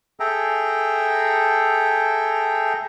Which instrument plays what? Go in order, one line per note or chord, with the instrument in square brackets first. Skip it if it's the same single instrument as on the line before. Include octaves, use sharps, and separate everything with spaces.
[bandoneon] G#4 A4 E5 G5 A#5